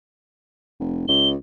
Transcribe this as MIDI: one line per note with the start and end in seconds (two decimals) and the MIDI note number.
0.80 1.07 29
1.08 1.35 37
1.08 1.29 103